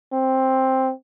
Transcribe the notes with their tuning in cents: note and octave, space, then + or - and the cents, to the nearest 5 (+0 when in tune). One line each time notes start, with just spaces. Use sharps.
C4 +10